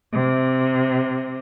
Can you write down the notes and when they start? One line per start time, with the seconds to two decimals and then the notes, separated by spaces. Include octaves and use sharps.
0.13 C3